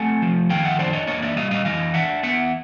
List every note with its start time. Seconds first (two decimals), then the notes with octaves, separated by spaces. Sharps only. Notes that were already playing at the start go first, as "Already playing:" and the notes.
Already playing: A3 C4 F#5 G#5
0.22 F3
0.50 D#3 F5 G5
0.65 E5 F#5
0.79 D4 C5 D5
0.93 C#5 D#5
1.07 A#3 C#5 D#5
1.22 D5 E5
1.37 G3 D#5 F5
1.51 D#5 F5
1.65 E3 D#5 F5
1.94 D4 E5 F#5
2.23 B3 E5 F#5